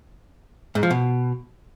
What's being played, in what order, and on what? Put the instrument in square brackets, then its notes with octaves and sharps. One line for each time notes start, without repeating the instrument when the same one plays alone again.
[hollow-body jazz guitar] G#2
F3
B2